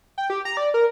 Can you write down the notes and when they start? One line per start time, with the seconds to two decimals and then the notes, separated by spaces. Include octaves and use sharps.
0.18 G5
0.30 G4
0.45 A#5
0.57 D5
0.74 A#4